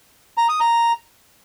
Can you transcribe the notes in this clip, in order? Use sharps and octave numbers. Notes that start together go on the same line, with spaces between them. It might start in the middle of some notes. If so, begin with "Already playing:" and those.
A#5
D#6
A#5